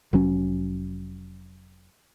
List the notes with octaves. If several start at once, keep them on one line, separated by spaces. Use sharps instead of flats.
F1 F#3 C#4